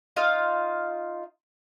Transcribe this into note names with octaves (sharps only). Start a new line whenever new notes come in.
D#4 F4 F5